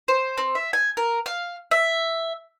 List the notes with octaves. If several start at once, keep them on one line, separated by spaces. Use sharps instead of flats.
C5
C4
E5
G#5
A#4
F5
E5